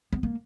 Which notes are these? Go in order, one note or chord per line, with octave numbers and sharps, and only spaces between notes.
B3
A#3